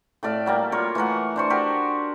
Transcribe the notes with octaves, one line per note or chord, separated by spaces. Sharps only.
A2 A4 D5 F5
F#3 G3 A#3
F4 A#4 C#5
E3 A3 A#4 F#5
D4 C5 C#6
F#4 G4 A#4